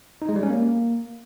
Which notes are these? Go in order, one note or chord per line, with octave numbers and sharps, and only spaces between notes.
D#4
G#3
G3
C#4
A#3